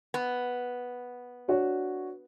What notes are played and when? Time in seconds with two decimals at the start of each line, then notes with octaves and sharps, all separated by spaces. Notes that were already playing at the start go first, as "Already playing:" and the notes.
0.14 B3
1.48 D4 F#4 C#5